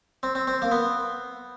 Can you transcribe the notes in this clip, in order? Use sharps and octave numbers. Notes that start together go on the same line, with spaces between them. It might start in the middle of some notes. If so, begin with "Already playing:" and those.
C4
C4
C4
A#3
B3